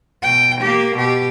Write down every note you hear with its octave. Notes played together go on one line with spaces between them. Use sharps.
B2 G5
A#3 G4
B2 G4